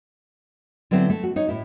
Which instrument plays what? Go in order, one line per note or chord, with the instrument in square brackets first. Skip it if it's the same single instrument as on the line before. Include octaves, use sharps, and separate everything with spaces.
[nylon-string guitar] D3 F#3 B3 C4 D4 E4
A3
F#4
D#4 C#5
A2 E4